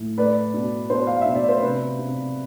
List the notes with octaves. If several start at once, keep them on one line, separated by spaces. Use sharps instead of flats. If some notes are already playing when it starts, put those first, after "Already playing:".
Already playing: A2
A3 B4 D5
B2
B2 C5
F5
B2 E5
D5
C5
C3 B4
C3